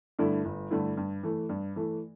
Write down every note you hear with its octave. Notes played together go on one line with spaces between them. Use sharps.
G2 D3 A3 E4
G1
G2 D3 A3 E4
G2
E3 A3
G2
E3 A3